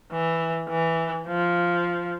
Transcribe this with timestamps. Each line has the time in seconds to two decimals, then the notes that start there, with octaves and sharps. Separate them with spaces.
0.12 E3
0.69 E3
1.27 F3